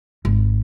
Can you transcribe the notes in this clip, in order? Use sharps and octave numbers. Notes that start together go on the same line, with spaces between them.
G#1